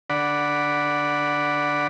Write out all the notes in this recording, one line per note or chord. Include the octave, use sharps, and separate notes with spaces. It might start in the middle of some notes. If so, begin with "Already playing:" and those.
D3 D5 F#5 B5